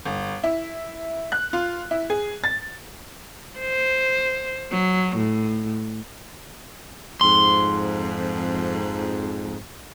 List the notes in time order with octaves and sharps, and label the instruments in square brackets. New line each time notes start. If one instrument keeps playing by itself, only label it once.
[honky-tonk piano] G1
E4
F#6
F4
E4
G#4
A6
[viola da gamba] C5
F#3
A2
[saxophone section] F2 G#2 [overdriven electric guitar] C6